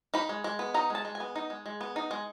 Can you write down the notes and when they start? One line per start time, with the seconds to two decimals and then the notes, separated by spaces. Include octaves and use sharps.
0.14 D#4 B5
0.29 G#3
0.44 G#3
0.59 B3
0.74 D#4 A#5
0.90 G#3 A5
1.05 G#3
1.15 G#5
1.20 B3
1.35 D#4
1.50 G#3
1.66 G#3
1.81 B3
1.96 D#4
2.11 G#3